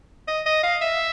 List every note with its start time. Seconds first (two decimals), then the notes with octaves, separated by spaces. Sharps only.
0.28 D#5
0.46 D#5
0.63 F5
0.82 E5